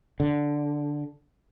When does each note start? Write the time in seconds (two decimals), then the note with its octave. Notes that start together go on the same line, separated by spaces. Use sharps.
0.20 D3